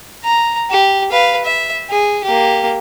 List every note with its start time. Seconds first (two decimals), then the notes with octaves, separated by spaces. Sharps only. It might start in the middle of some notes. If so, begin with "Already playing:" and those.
0.24 A#5
0.70 G4
1.11 B4 F5
1.45 E5
1.90 G#4
2.24 A#3 G4